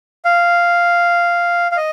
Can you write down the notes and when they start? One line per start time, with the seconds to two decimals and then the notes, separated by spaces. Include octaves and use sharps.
0.25 F5
1.72 F5
1.77 D#5